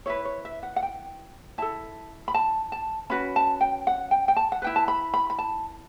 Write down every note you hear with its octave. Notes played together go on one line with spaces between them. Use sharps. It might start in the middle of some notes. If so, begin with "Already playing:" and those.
E4 B4 C#5
C#5
E5
F#5
F#5
G5
E4 A4 A5
B5
A5
A5
C#4 F#4 B4 B5
A5
G5
F#5
G5
G5
A5
F#5
E4 B4 G5
A5
B5
B5
B5
A5